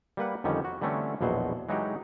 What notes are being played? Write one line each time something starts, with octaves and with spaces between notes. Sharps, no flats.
G3 A#3 B4 F#5
F2 D3 D#3 G3 C#4
F#4
D3 E3 G3 A3 C4 C#4
A#1 E2 B2 F#3 C5
E3 F#3 G#3 D#4 F#4 G4